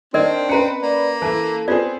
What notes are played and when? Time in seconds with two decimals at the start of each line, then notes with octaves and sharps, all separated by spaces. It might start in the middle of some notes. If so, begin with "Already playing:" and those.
0.14 D#3 C4 D4 A#4 D5 D#5
0.49 C#4 B4 A#5 C#7
0.83 A#3 D5
1.22 E3 E4 A4 A5
1.68 B3 C4 F4 G#4 D5